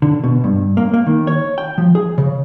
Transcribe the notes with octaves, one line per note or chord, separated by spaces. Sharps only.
D3
B2
G2
A#3
A#3
D#3
C#5
G5
F3
G#4
C#3